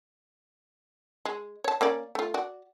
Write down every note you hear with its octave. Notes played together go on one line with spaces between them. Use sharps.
G#3
C#5 A5
A#3 C#4 D5
A3 F4
F#4 D5